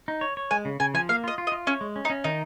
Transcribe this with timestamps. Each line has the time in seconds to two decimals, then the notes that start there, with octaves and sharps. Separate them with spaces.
0.08 D#4
0.21 C#5
0.37 C#5
0.51 G#3 G#5
0.65 C#3
0.80 C#3 G#5
0.94 F3 G#5
1.09 A#3 F5
1.24 F4 D#5
1.38 F4
1.47 D#5
1.52 F4
1.67 C#4 C#5
1.81 G#3
1.96 C#4
2.05 D#4
2.10 C#4
2.24 D#3 D#4